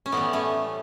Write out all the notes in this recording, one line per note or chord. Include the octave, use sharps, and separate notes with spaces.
C#4
A2 E3 G3 B3
A3 C#4